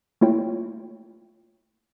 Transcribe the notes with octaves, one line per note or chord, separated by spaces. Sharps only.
A3 A#3 E4 F4 C#5 G5